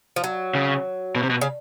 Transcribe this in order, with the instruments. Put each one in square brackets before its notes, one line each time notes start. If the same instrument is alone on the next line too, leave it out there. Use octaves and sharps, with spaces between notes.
[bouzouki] F3
F#3
[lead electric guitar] C#3
B2
C3
B2
[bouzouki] C#3